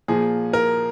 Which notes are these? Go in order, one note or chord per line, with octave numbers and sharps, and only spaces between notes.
A#2 F3 A#3 G#4
A#4